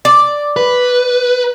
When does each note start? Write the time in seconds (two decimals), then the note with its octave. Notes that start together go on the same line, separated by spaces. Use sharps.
0.05 D5
0.56 B4